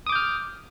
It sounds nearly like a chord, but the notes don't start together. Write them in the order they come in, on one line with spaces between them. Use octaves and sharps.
D#6 D6 G6 F6